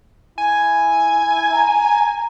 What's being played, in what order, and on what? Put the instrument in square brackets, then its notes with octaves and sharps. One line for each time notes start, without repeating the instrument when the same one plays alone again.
[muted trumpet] E4 [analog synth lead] G#5
[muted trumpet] A#5